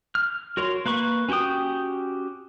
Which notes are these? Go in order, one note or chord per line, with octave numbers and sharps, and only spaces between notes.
F6
F#4 A#4 C#5 C6
A#3 B4 B5 C#6
C#4 F#4 G4 G5 D#6